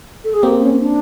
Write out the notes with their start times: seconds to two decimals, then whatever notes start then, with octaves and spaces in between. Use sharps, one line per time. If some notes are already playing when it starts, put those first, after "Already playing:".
0.24 A4
0.34 G#4
0.43 A#3 C4 G4
0.61 C#4
0.79 D4